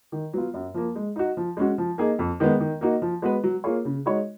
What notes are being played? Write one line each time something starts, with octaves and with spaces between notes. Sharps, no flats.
D#3
F#3 B3 F4
F#2
F3 A#3
G#3
D#4 F#4
F3
G#3 C#4 F#4
F3
A#3 D#4 G#4
F2
D#3 G#3 B3
D#3
A#3 D#4 F#4
F3
G#3 B3 F#4 B4
F#3
A#3 F4 G#4 C#5
C#3
G#3 D#4 F#4 C#5